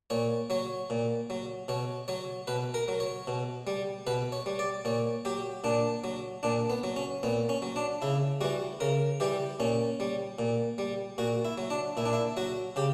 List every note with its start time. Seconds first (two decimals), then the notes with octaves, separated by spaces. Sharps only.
0.10 A#2 C#5
0.50 F#3 C#5
0.90 A#2
1.30 F#3
1.68 B2 C#5
2.08 F#3 C#5
2.47 B2 B4
2.74 A#4
2.88 F#3
3.00 C#5
3.27 B2
3.67 G3
4.07 B2 B4
4.32 C#5
4.46 G3
4.59 D5
4.85 A#2 C#5
5.25 F#3 G4
5.64 A#2 D4
6.04 F#3
6.43 A#2 D4
6.70 B3
6.84 F#3
6.96 C#4
7.23 A#2 B3
7.49 C#4
7.62 F#3
7.76 D4
8.02 C#3 E4
8.41 E3 G3 F#4
8.80 C#3 A#4
9.20 E3 G3 G4
9.60 A#2 C#4
10.00 G3
10.39 A#2
10.78 G3
11.18 A#2 F#4
11.45 E4
11.58 F#3
11.70 D4
11.97 A#2 E4
12.06 D4
12.13 E4
12.37 F#3 F#4
12.76 C#3 G4